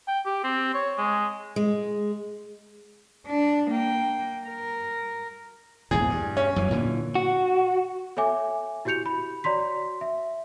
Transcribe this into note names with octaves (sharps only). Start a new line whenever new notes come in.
G5
G4
C4
C#5
G#3
G#3
D4
A#3 G5
A#4
A#1 E2 G#2 G#4
G2
C#4
F#2 E3
A#2 D3 E3
F#4
A4 C#5 E5 G#5 D6
E4 F#4 G4 G6 C#7 F7
B5
F#4 C#5 D5 A#5 C6 B6
E5